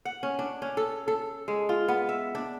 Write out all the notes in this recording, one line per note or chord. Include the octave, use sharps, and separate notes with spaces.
F#5
C#4
D4
C#4
A4
A4
G#3
F4
B3
E5
D4